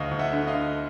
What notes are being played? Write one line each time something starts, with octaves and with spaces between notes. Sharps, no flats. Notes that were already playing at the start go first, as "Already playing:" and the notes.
Already playing: D2 D#5 F5
D2
E5 F#5
D3
D#5 F5
D3